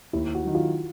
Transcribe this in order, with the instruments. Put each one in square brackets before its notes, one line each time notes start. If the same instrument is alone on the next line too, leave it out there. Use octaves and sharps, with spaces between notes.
[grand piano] D#2 [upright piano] E4
[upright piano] F#4
[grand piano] D#3 F#3
[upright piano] F4